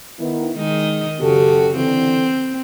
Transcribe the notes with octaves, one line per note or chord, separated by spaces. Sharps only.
D#3 B3 E4
D#3 G#3 D#4 D#5
F#2 C#3 F#4 G4 A4
D3 E3 C4